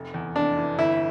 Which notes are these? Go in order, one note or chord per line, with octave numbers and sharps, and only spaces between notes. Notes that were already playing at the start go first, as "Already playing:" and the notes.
Already playing: F1
E2
F1 D4
E3
G1 E4